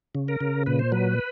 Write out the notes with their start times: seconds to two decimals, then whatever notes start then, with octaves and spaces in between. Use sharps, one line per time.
0.15 C#3
0.28 A#4
0.41 C#3
0.66 A#2 B4
0.79 C5
0.92 F#3 B4